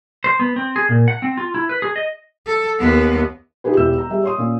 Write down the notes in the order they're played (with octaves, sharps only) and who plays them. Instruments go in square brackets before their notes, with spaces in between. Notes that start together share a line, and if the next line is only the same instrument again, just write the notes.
[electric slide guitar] C5
B3
C4
G#4
A#2
F#5
C4
F4
E4
B4
G#4
D#5
[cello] A4
D#2 B3
[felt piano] D#4 F4 G4 G#4 B4
E1 E4 G4 E6 G6 E7
A#5
G3 G#4 E5
C#5 C6 D#6
A#2 C#4